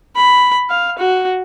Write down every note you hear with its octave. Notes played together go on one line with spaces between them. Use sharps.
B5
F5
F#4